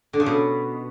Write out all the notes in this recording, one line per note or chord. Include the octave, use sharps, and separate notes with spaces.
D3
C#3
B2